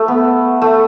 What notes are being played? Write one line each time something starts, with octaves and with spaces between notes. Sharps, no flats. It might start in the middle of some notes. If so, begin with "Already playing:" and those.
Already playing: A3
B3
A3